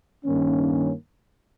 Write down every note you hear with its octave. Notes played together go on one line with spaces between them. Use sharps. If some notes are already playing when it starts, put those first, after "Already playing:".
G2 D#3 A#3 C#4